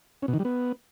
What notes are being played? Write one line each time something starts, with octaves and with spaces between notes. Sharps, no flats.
C#4
B2
D#3
G3
B3